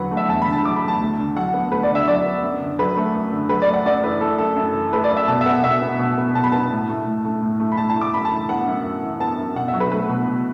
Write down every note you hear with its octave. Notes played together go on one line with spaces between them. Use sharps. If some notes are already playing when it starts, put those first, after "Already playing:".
Already playing: E2 D3 F#3 B4 F#5
A3
E5
E2 A5
B5
D3
A5
F#3 D6
B5
A3
A5
D2
D3
F#3 F#5
B3
D2 B4
D5
D3
E5
F#3 D5
B3
F#2
D3
F#3 B4
A3
F#2
D3
F#3 B4
D5
A3
F#5
F#2 D5
E3 B4
A3 A4
F#2 A4
F#2
E3
A3 B4
D5
F#2
E5
B2 A5
E5
B3 F#5
B2 E5
B3
B2
B3
B2 A5
B5
B3 A5
A2
A3
A2
A3
A2
A3
B5
A2 A5
A5
A3
D6
F#2 B5
A5
E3
B3 F#5
F#2
F#2
E3
B3 A5
F#2
B2 F#5
E5
F#3
B4
A3 B4
B2
B2